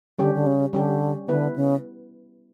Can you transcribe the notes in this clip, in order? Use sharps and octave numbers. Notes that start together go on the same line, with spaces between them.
D3 G3 C#4 G4
D3
C#3
D3 G3 C#4 G4
D3 B3 E4 B4
C#3